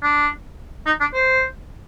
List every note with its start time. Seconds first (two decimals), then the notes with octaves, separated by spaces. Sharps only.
0.03 D4
0.86 D#4
1.01 D4
1.14 C5